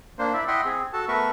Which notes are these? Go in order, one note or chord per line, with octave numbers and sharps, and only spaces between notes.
A#3 D4 C5
E4 D5 E5
E4 D#5 E5 F#5 G5 C6
C4 G#4
F#4 A4 A5
A3 B3 A#4 B4 E5 C#6